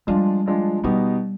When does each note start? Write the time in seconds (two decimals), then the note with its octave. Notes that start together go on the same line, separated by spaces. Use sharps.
0.07 F3 G3 G#3 D4 F4
0.46 F3 G#3 D4 F4
0.84 B2 G3 B3 D#4 G4